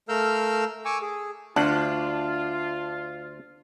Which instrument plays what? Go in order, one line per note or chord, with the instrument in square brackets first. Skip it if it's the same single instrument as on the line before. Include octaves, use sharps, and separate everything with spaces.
[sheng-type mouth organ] A3 A#4 F5 E6 F6 G6
G#5 C#6 D6 E6
G#4
[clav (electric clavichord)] D2 F#5 [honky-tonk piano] D4 [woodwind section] F4